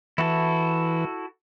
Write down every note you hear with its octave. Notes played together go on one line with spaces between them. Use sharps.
E3 E4 F#4 A4